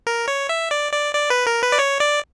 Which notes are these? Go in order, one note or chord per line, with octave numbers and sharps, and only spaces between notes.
A#4
C#5
E5
D5
D5
D5
B4
A#4
B4
D5
C#5
D5